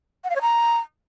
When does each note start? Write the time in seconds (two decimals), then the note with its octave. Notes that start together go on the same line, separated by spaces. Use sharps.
0.24 F#5
0.29 F5
0.35 C#5
0.41 A#5